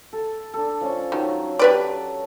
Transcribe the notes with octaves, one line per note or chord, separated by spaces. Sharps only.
A4
D4 A4
F3 C#4 C#5
D#3 F#3
G4 B4 D5